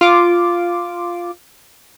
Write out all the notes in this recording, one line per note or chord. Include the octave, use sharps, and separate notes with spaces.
F4 D6